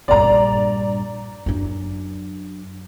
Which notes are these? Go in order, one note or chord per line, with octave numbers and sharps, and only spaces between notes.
A#1 G2 D5 A#5
F#2 D4